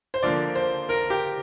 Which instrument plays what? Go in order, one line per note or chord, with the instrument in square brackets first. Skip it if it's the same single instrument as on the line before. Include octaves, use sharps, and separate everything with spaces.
[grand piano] C5
D3 F3 A#3 D5
C5
A#4
G4